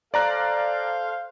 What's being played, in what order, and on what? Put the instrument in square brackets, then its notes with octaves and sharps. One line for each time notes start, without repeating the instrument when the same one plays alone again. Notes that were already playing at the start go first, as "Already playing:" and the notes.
[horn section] A4 C5 F5 [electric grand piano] D5 A#5 F#6